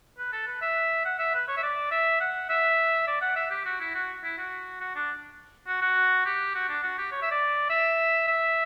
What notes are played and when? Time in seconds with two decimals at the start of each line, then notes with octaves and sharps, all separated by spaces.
0.19 B4
0.32 A4
0.47 B4
0.62 E5
1.05 F#5
1.19 E5
1.35 B4
1.48 C#5
1.57 E5
1.63 D5
1.91 E5
2.20 F#5
2.50 E5
3.07 D5
3.21 F#5
3.36 E5
3.50 G4
3.65 F#4
3.80 E4
3.95 F#4
4.24 E4
4.38 F#4
4.80 F#4
4.95 D4
5.67 F#4
5.82 F#4
6.26 G4
6.55 F#4
6.69 D4
6.83 F#4
6.98 G4
7.12 C#5
7.22 E5
7.31 D5
7.70 E5
8.28 E5